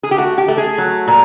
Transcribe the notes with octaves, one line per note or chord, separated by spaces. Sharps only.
G#4
G4
A3 F#4
G4
A3
G#4
F#3
A#2